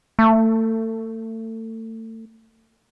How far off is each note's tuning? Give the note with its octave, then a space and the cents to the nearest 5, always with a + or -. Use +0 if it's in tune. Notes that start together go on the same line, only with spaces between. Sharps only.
A3 +30